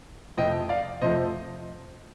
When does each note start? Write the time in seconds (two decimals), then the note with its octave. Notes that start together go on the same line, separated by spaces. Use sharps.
0.37 F2 C3 F3 A3 D#5 G5
0.69 D5 F5
1.02 F2 C3 F3 A3 C5 D#5